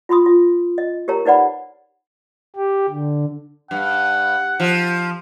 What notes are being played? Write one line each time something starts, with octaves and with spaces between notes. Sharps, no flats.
F4 B5 C6 D#6
F4
D#5
G4 A#4 C#5 A#5
D#4 B4 D5 F#5 B5
G4
D3
G2 F#5
F3